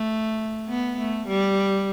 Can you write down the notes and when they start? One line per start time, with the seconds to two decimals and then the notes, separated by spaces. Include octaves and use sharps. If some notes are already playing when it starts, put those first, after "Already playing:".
Already playing: A3
0.68 B3
0.98 A3
1.28 G3